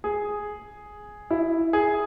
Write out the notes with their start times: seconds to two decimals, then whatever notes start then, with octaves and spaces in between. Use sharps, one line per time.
0.04 G#4
1.31 E4
1.73 G#4